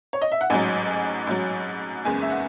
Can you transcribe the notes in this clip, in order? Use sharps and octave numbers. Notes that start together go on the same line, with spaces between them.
C#5
D#5
E5
F#5
A1 G#2 F#3 G#5
A1 G#2 F#3
F#1 E2 C#3 G#3 G#5
E5
F#5